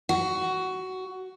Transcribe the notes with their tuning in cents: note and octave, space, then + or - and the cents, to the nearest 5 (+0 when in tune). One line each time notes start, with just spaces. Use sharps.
F#4 +15